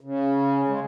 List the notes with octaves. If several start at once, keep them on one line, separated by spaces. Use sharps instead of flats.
C#3
G#3